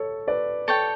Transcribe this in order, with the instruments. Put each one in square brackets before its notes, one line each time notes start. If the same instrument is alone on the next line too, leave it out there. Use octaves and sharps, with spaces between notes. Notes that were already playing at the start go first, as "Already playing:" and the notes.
Already playing: [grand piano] A4 C#5
B4 D5
[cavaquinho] A4 C#5 G5